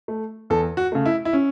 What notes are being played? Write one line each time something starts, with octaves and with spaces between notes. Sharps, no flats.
A3
E2 A4
F#4
C#3 A3
E4
E4
C#4